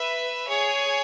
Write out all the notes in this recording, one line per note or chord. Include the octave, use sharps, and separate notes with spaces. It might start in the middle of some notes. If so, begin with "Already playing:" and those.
Already playing: B4 E5
G#4 C#5